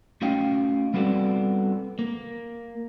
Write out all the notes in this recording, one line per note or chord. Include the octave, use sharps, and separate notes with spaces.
A3 C#4 F#4 D#5 F5 G5
G3 B3 C4 F#4 A4 D5
A#3